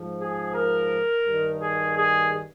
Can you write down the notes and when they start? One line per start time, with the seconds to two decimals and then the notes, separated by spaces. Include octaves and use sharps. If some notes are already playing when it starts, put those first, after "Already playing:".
Already playing: G#2 F3
0.20 G#4
0.55 A#4
1.26 G2 D#3
1.62 G#4
1.97 G#4